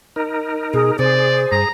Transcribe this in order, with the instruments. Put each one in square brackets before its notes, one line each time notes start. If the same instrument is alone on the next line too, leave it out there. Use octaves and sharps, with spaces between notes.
[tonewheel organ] D#4 A#4
[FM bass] B2 [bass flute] G#4
[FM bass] C3 [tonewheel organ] G#4 [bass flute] C5 [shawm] D5
[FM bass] G2 [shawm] A#5